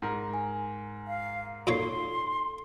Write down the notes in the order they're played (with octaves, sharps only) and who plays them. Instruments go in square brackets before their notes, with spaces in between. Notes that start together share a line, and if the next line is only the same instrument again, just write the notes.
[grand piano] G#2 A#4
[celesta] G#5
[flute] F5
[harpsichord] A#2 A#3 C#5 [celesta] D#4 A4 C7 [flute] C6